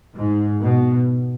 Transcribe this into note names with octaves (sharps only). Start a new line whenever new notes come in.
G#2
B2